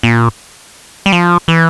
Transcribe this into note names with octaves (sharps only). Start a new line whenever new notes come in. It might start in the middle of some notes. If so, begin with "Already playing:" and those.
A#2
G3
F3
E3